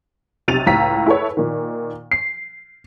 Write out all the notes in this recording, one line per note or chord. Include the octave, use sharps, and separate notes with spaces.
B1 C3 A6 D#7 F7
C#2 A2 F5 A#5 E6 B6
E4 G#4 A4 B4 C#5
A#2 D#3
C7